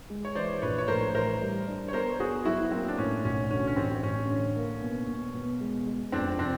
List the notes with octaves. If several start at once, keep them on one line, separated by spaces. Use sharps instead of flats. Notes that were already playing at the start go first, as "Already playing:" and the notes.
G#3
C#5
E3 C5 D5
A#1 B4 C#5
C#5
A2 A#4 C5
E3 A#4 C5
G3
D4
C#5
B3 A#4 C5
B3 F#4 G#4
F#3 E4 F#4
A#3 C4
D4
A2 C#4
B1 C#4
D3 C#4
C#4
A1 C4
A1 C#4
D3
A#3
B2
B2
B2
G#3
G#3
F2 C4 D4
C3 C4 D4